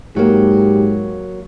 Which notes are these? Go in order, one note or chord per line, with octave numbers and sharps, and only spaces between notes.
G#2 F#3 A#3 G4